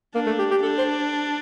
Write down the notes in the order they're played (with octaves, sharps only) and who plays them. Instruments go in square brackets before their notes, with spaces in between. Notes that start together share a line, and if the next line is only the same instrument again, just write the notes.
[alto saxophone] A#3 [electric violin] D4
[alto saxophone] A3
G4
G4
[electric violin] D4 [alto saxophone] A4
[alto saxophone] C5